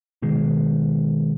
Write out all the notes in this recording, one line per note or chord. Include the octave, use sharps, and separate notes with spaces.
B2 D#3 G#3